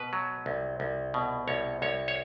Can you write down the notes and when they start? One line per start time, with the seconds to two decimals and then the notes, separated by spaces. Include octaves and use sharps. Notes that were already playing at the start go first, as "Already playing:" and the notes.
Already playing: B2 B4
0.13 F#3
0.46 C2
0.80 C2
1.14 B2
1.48 C2 C#5
1.82 C2 C#5
2.08 C#5